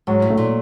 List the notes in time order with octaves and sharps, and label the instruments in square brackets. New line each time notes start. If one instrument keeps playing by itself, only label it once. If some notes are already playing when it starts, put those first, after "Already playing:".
[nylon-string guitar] G#2 [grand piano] F#3
[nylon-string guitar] A2
[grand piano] A3
[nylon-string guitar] A#2